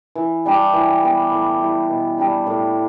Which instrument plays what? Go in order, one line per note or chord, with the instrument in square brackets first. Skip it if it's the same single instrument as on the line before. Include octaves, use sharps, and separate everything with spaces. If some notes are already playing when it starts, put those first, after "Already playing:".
[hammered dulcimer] E3
G3 D4 G4
E3
B3 G4
A2
G3 E4 G4
B2
G3 D4 G4
A2